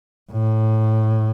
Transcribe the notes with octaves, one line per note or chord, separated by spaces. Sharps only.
A2